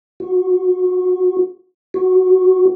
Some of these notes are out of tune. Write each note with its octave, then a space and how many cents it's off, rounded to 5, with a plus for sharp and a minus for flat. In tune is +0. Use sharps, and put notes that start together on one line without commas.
F#4 -25
F#4 +0